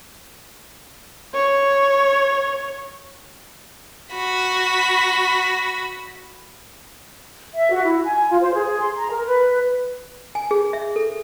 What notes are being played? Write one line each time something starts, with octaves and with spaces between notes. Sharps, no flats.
C#5
F#4 B5
E5
F#4
E4
G#5
F4
C5
G#4
C6
A#5
A#4
B4
G#5
G#4
E5
A4